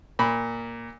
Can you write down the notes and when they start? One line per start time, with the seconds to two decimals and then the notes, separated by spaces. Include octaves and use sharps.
0.19 A#2 B5